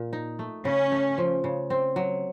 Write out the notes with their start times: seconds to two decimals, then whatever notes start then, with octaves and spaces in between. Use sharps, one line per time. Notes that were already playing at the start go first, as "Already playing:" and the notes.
Already playing: A#2
0.13 D#4
0.39 A3
0.65 C#3 C#4
0.92 A3
1.18 F3
1.44 C#3
1.70 C4
1.96 F#3